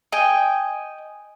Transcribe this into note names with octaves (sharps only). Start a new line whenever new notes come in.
D#5 G5 G#5